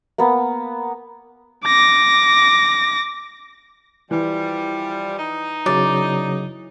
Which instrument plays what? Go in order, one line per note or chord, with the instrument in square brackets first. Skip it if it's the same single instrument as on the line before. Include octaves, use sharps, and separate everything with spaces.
[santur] A#3 B3
[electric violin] D6 A#6
[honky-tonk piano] E3 [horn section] F3 G3
[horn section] D#4
[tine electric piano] C#3 F#3 [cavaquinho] D5